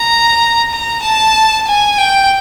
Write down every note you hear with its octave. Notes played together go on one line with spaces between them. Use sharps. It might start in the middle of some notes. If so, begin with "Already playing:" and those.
Already playing: A#5
A#5
A5
G#5
G5